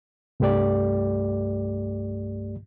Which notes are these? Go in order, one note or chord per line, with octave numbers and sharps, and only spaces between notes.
C2 G2 A3 G4 D5